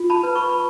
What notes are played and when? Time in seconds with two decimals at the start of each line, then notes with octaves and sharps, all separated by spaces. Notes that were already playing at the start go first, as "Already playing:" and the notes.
Already playing: F4
0.10 A5 B5
0.23 B4
0.35 B5 C#6